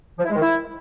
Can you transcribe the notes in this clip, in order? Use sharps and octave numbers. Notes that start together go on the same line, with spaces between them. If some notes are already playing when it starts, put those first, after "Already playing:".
F3
E4
G#3
D#3
E4